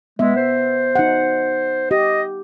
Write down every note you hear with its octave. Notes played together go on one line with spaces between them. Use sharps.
G#3 B3 E5
C5
D#4 F#5
G4 D#5